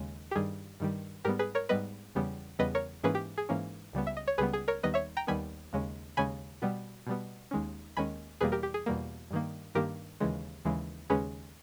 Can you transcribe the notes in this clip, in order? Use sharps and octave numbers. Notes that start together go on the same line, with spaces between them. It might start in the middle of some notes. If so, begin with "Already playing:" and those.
Already playing: D#2 C#3 G#3
G4
G2 D#3 G3 G#4
G2 D#3 G3
G#2 G3 B3 G4 A#4
G#4 B4
A#4 C#5
G#2 G3 B3 B4 D#5
E2 C#3 G3 B3
E2 C#3 G3 B3 B4 D#5
A#4 C#5
G#2 E3 A#3 C#4 G#4 B4
G4
G#4
G#2 E3 A#3 C#4
C#2 C#3 G3 B3
E5
D#5
C#5
C#2 C#3 G3 B3 G#4 B4
G#4
A#4 C#5
D#2 D#3 G3 B3 B4 D#5
C#5 E5
G5 A#5
D#2 D#3 G3 B3 G#5 B5
D#2 C#3 G#3 C#4
D#2 C#3 G#3 C#4 G#5 B5
B2 G3 B3
B2 G3 B3
D#2 D#3 G#3 C#4
D#2 D#3 G#3 C#4 G#5 B5
E2 B2 G3 A#3 G#4 B4
G4 A#4
G4
G#4
E2 B2 G3 A#3
G2 D#3 A#3
G2 D#3 A#3 G4 A#4
D#2 C#3 E3 G#3
D#2 C#3 E3 G#3
D#2 C#3 G#3 C#4 G#4 B4